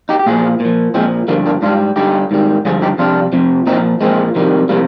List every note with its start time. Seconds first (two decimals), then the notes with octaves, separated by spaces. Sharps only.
0.09 D#4 G4
0.19 G4
0.26 A#2 F3 F4 G#4
0.60 A#2
0.65 F3
0.94 A#2 F3 G#3 C4
1.28 G2 D3 F3 G3 A#3
1.46 A#3 D4
1.62 G#2 G3 D4 F4
1.96 G2 D3 G3 D#4 G4
2.31 G#2 D#3 G3
2.65 G2 D3 F3 F4 G#4
2.82 D#4 G4
2.98 F2 C3 G3 D4 F4
3.33 F2 C3 F3
3.67 A#2 F3 C4 D#4
4.01 A#2 F3 G#3 C4
4.35 F2 C3 D#3 G3
4.69 C3 F3 G3 A#3